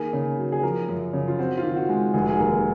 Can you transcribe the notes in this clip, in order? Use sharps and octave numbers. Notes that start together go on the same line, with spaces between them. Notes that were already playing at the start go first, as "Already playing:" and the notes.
Already playing: D#3 A#3 G#4
C#3
F#3
G#4
F3 A#4
F#2
C#3
F4
C4 F#4
F4
D#3
F#4
G#3
F1 G#4
F#4
G#4
D#2 A#4